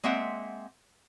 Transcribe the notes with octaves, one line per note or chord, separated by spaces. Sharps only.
G#3 A#3 C4 E5 F#5